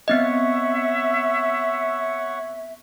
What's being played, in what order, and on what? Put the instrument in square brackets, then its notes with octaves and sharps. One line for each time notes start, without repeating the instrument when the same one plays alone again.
[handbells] B3 C4 D#5 [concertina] C#5 F#5 C#6 [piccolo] E5